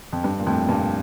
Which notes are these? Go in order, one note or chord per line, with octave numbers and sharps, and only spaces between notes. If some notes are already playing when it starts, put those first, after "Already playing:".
F2
G2
A#2
F2 A2
G2 A#2